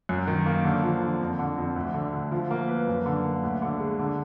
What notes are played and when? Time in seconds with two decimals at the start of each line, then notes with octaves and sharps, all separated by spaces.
0.09 F#2
0.27 D#3
0.46 A#3
0.64 D3
0.83 F3
1.01 D3
1.21 F2
1.39 D3
1.58 F2
1.76 D2
1.94 D3
2.13 D2
2.32 F3
2.51 A#3
2.69 B4
2.87 F#2
3.06 D3
3.25 A#3
3.43 D2
3.62 D3
3.80 G#3
3.99 D3